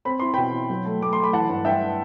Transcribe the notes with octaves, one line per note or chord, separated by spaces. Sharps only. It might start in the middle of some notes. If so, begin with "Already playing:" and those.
C4 B5
E4 C6
B2 G5 B5
E4
F#3
A3
A3 D6
A3 C6
B5
E3 F#5 A5
G2
G2 E5 G5